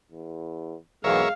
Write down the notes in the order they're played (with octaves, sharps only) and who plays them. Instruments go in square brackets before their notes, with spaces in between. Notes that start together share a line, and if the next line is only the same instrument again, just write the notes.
[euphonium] E2
[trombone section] B1 E2 [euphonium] G#3 [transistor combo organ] A#4 C#5 E5 [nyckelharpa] F5